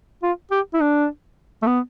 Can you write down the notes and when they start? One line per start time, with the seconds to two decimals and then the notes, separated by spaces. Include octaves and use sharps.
0.23 F4
0.51 G4
0.74 E4
0.81 D4
1.62 A3
1.67 B3